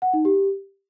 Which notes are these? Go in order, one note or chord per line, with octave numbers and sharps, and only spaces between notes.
F#5
D#4
G4